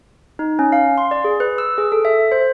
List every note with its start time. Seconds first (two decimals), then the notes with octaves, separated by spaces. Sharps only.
0.39 D#4
0.59 C#4
0.72 F5
0.98 C6
1.11 D5
1.25 G#4
1.40 B4
1.58 E6
1.78 G#4
1.92 A4
2.05 E5
2.32 C5